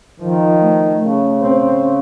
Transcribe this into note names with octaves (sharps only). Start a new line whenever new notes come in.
D#3 F3
A3
C#3 A3
C4